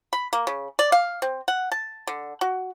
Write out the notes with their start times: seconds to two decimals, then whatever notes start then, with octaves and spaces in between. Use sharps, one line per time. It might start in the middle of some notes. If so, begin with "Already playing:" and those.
0.13 B5
0.33 A#3
0.47 C#3
0.79 D5
0.92 F5
1.22 C4
1.48 F#5
1.72 A5
2.07 D3
2.41 F#4